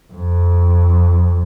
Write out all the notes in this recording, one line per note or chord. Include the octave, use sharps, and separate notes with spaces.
F2